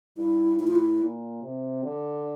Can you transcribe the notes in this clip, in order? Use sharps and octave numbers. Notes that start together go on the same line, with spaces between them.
G2 E4
A2 E4
F4
E4
A#2
C3
D3